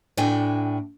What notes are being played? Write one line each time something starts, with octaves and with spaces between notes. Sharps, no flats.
A2 D4 F#4 G5 G#5